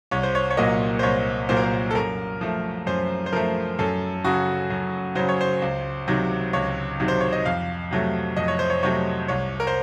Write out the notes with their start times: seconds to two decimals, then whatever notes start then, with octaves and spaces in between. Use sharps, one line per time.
0.11 C2 C#5
0.23 C5
0.35 C#5
0.51 C#5
0.57 A#2 F#3 A#3 D#5
0.99 C5
1.03 C2 C#5
1.49 A#2 F#3 A#3 C5
1.57 A#4
1.63 C5
1.91 A4
1.95 F#2 A#4
2.41 F3 A3
2.87 F#2 C5
3.26 C5
3.33 F3 A3 A#4
3.79 F#2 A4
4.24 C#3 F#3 F#4
4.70 F#2
5.15 C#3 F#3 C5
5.29 C#5
5.41 C5
5.62 C#2
6.08 C3 D#3 F#3
6.53 C#2 C#5
7.00 C3 D#3 F#3
7.08 C5
7.20 C#5
7.32 D#5
7.45 F2 F5
7.91 C3 F#3 A3
8.37 F2 D#5
8.48 C#5
8.59 C5
8.70 C#5
8.83 C3 F#3 A3 C#5
9.28 C2 C#5
9.60 A#4
9.67 C5